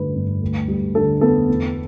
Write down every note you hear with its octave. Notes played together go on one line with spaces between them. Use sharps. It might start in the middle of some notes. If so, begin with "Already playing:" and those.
Already playing: G2 D3 A3 B4
G2
D2
G3
D3 A4
B3 A4
E2